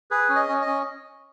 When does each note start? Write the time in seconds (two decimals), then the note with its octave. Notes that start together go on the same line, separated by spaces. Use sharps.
0.11 G#4 B4
0.29 C#4
0.36 D#5
0.49 C#4
0.61 D#5
0.67 C#4